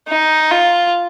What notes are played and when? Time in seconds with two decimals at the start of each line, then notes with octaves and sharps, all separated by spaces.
0.08 D#4
0.51 F4